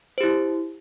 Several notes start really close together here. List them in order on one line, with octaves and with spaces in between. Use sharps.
C5 G4 E4